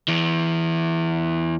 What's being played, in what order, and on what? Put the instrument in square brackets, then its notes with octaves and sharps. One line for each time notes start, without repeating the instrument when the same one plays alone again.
[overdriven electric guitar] E2 E3